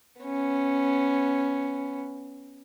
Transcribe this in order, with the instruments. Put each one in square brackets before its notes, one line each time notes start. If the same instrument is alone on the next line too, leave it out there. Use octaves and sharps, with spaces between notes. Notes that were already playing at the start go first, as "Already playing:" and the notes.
[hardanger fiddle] B3 C#4